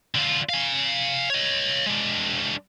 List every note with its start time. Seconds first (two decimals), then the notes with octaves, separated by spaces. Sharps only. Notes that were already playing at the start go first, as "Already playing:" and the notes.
0.15 D3 F4
0.49 F5 G#5
1.30 C#5 D#5
1.86 G#3 D4